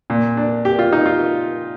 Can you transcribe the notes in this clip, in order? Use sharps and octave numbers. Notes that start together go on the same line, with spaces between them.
A#2
D4
G4
F4
D#4
F4